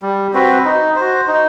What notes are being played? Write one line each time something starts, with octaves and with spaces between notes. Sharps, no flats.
G3
C4 F#4 B4
D#4
F#4 C5
D#4